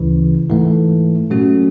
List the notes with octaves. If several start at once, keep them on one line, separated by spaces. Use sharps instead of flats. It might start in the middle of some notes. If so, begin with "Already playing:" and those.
Already playing: D2 C#3 E3
G#2 E3 A3
A#2 F#3 A3 C#4 F#4